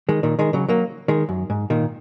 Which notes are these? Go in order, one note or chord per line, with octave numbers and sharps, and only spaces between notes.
D#3 G#3
A#2 D#3
D#3 G#3
C#3 F#3
F#3 A#3
D#3 G#3
F#2
G#2
A#2 D#3